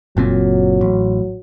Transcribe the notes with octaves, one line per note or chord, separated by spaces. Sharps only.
F#1 A#2 F#3 C4
A1